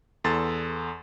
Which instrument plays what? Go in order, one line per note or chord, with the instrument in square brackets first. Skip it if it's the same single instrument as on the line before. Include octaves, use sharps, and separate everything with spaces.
[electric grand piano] E2 A4 C6 A6